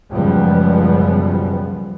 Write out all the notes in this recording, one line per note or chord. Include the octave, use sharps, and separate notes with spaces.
C#2 F#2 B2 F3 G3 B3